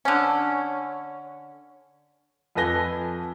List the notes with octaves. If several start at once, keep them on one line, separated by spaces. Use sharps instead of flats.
D3 C#4
F2 A4 B4 G#5 A#6 G7